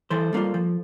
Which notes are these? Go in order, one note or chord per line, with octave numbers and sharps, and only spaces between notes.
E3 A4 C5
G3 A#3 D4 F4
F3